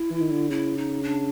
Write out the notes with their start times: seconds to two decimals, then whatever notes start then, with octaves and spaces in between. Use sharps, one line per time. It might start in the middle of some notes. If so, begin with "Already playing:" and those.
Already playing: E4
0.10 E3
0.20 D#3
0.31 D3
0.50 C#3 E4
0.77 D#4
1.03 D4